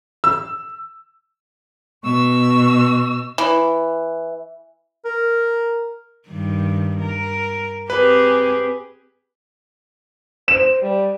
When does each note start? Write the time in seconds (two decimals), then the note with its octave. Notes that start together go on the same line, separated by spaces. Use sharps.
0.24 E6
2.04 B2 C#6 E6
3.38 E3
5.05 A#4
6.28 G2 D#3
7.01 A#4
7.90 C4 G4 G#4 B4
10.48 C5 E7
10.82 G3